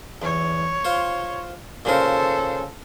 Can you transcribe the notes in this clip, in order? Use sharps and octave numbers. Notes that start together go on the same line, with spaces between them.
E2 C#5
F4 C5
A#2 C#3 A4 A#4 C5